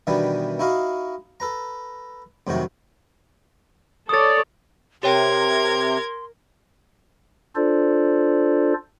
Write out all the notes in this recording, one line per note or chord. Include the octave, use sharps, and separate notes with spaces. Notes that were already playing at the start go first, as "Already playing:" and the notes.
B2 D#3 E3 G3 B3 D4
D#4 E4 F#4 D#5 F5
A4 B4 A#5
F2 A2 C3 D#3 F#3 F#4
A4 C#5 D5 D#6 A6
C3 G4 A#4 C#5 G5 C6 G#6
D4 F4 A4 C5 D5